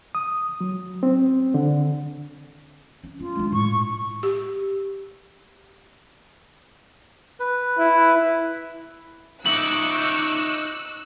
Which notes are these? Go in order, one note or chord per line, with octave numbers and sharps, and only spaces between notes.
D#6
F#3
C4
D3
C#4
C#4 F4
G#3 D4
A2 C#6
G4
B4
E4
D#4 E5 C#6 D6 E6 F#6 F#7